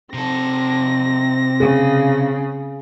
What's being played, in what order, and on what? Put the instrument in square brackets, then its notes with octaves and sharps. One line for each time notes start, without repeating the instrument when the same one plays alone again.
[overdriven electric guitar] C3 A4 [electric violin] C4 A#6
[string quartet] C#3 [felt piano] G#4